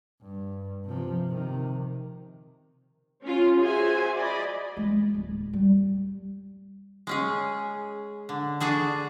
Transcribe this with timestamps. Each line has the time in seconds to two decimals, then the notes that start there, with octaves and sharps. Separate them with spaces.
0.23 G2
0.85 C3 F3
1.29 C3 D#3
3.23 C#4 F4
3.59 F#4 G#4 C5 E5 G#5
4.16 D5 D#5 B5
4.77 G#3
5.14 D1
5.53 G3
7.07 G#3 C#4 G#4
8.29 D3
8.60 D4 F#4 G#4 A4